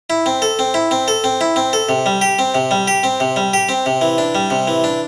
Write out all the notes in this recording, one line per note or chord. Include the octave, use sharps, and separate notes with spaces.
E4
C4
A4
C4
E4
C4
A4
C4
E4
C4
A4
C3
G3
G4
C4
C3
G3
G4
C4
C3
G3
G4
C4
C3
E3
D4
G3
C3
E3
D4